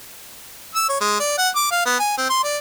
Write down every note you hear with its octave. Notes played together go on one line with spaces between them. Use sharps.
E6
C#5
G#3
D5
F#5
D6
F5
B3
G#5
C4
C6
D5